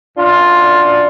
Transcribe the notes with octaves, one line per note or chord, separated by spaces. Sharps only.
F#2 D4 F4